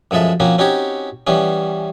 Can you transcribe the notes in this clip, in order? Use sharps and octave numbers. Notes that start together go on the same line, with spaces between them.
F#2 F3 G#3 A4 E5
F3 A#3 C4 C#4 F#4
C4 C#4 D#4 F#4 G4 C#5
E3 G3 B3 C#4